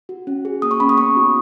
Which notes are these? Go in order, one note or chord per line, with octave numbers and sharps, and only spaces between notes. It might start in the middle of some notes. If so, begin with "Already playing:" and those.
F#4
C#4
G#4
A#3 D#6
C#6
C#4 G#4 B5
D#6
B3 C#6
D#4 F#4